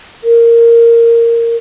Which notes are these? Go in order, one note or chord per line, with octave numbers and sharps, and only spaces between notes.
A#4